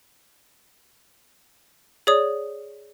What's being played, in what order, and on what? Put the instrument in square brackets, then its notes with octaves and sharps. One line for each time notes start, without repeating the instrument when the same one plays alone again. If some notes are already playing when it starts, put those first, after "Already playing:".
[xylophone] G#4 C#5 D5 D#6